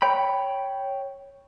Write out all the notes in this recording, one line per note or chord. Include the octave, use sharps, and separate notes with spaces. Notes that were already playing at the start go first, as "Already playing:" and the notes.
C#5 G5 B5